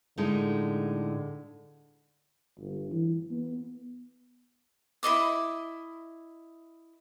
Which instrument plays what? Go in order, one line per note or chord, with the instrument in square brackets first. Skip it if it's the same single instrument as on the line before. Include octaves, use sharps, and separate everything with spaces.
[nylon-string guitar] A2 G#3 D#4 [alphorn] D3
[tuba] G1
E3
B3
[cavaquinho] E4 C5 D#5 D6